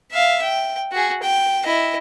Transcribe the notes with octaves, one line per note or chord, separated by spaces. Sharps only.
E5 F5
G5
F#4 G#4
G5
E4 D#5